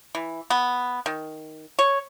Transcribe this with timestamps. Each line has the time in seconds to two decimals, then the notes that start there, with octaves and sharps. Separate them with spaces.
0.15 E3
0.50 B3
1.06 D#3
1.79 C#5